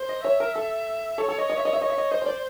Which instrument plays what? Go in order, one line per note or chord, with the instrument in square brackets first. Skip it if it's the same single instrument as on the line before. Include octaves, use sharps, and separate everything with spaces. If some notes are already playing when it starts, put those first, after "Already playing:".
Already playing: [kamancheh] C5
[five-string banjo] D#5
[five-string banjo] C#5 [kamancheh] E5
[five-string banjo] A#4
A4
[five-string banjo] A4 [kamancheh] C#5
[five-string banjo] A4
D#5
D#5
E5
D#5
E5
[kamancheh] C#5 [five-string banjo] D#5
[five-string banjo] E5
D#5
[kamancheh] C5 [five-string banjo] D#5
[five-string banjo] C#5
D5